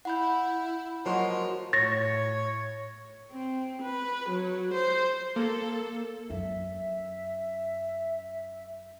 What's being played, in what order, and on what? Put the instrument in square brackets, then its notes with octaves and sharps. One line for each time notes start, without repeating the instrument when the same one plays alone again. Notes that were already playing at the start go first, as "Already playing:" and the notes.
[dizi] E4 [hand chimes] F#5 B5 G6
[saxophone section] F3 G#3 A#3 [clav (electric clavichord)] F#3 F#4 [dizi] C6
[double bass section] A2 [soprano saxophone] C#5 [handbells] A6 A#6
[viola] C4
B4
F#3
C5
[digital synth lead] A#3 [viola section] A4
[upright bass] F#2 [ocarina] E5